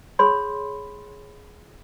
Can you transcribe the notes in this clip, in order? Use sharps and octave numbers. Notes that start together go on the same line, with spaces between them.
G#4 C#5 B5 C6